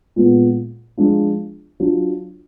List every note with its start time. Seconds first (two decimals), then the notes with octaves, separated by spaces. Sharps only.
0.16 A#2 G#3 B3
0.98 F3 G#3 D4 F4
1.80 F#3 D4 F4